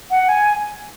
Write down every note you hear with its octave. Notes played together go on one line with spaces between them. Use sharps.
F#5
G#5